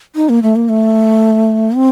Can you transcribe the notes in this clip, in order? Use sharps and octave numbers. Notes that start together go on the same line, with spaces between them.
D#4
A#3
A3
A#3
A3
C4